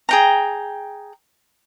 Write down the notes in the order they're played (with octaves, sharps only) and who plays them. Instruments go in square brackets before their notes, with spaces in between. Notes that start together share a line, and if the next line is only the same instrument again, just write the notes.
[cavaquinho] G#4 G5 A#5